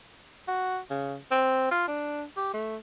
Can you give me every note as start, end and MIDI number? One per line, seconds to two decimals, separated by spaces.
0.48 0.79 66
0.90 1.16 49
1.31 1.69 60
1.71 1.86 65
1.88 2.24 62
2.37 2.51 67
2.54 2.77 57